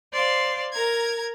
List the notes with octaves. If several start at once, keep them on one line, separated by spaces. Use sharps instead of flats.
C5 D5 F5 C6
A#4 A#5 G#6